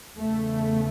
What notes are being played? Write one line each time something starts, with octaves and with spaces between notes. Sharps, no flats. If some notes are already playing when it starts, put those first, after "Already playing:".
E2 C#3 A3